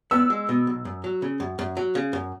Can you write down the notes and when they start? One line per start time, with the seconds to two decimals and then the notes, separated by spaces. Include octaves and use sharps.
0.11 B3 E6
0.30 G#3
0.49 B2
0.67 B1
0.85 F#2
1.04 F#3
1.22 C#3
1.40 F#2
1.59 F#2
1.77 F#3
1.95 C#3
2.13 F#2